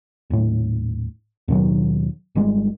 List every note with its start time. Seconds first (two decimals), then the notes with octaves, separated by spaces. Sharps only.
0.30 D#1 A2
1.48 D#2 B2 D#3 F#3
2.35 G#1 G3 G#3